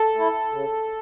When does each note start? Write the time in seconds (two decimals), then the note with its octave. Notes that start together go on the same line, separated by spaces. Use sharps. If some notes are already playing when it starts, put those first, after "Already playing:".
Already playing: A4
0.15 A3 E4
0.52 C#3